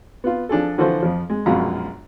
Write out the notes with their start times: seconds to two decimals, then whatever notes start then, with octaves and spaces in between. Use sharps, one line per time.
0.24 B3 F4
0.49 F3 D4 G#4 A4
0.78 D3 E3 F3 F#4 A4 C5
1.03 F2 F3
1.30 G#3
1.46 A#1 F#2 B2 G#3 F4 A#5